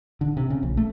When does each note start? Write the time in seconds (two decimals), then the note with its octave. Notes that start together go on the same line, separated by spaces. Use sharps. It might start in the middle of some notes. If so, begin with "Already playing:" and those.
0.21 D3
0.37 C3
0.50 C#3
0.63 A#1
0.77 A3